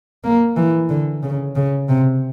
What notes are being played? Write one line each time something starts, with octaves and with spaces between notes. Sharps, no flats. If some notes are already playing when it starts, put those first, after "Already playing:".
A#3
E3
D3
C#3
C#3
C3